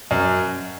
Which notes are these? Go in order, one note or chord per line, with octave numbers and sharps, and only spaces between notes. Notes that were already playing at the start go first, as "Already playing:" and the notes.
F#2